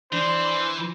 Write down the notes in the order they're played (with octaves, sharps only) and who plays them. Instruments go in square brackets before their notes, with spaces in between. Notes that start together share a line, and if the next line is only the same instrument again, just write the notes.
[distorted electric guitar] E3 [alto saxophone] D4 [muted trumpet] C5